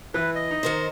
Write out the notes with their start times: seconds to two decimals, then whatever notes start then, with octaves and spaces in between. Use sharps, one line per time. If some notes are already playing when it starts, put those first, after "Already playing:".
0.14 E3 E4 B4
0.35 D#5
0.51 D#4
0.63 D#3 A#4 C5